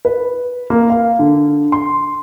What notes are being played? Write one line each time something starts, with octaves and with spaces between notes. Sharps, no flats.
B4
A#3
F5
D3
C6